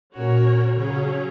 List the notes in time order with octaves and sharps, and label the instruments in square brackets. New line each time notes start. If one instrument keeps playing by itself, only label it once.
[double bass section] A#2 [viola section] C#4 F#4 A#4 C#5
[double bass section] C#3 [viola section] F#3 C#4 G#4 C#5